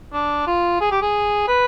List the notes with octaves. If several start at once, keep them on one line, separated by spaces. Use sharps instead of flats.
D4
F4
G#4
G4
G#4
B4